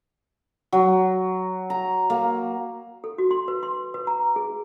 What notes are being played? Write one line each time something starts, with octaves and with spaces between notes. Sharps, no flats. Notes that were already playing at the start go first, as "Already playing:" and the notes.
F#3
A#5
A#3
A4
F#4
C6
B4
C6
B4
A#5
G#4